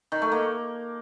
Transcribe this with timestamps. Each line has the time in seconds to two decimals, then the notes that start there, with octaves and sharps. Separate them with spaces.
0.12 D#3
0.22 A3
0.32 A#3